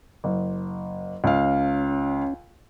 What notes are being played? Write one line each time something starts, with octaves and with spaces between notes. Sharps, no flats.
F#1
C#2 C#4 F5